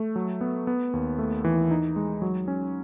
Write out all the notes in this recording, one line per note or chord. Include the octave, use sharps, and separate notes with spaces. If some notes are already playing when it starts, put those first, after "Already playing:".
Already playing: A3
F#3
B3
B3
D#2
A3
E3
D#4
G#3
F#3
C#4